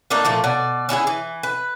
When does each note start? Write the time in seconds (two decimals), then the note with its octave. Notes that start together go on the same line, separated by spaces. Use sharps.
0.10 A3 A#3 D4 D#4
0.25 A#2 F3 A3
0.44 B2 D5
0.89 C#4 E4 F#4 G#4
1.07 E3
1.43 B4